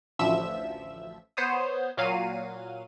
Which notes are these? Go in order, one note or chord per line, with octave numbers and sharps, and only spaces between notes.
A1 D2 F3 E5 E6 E7
B3 C5 C#5 D#6
A#2 F#3 F5 D#7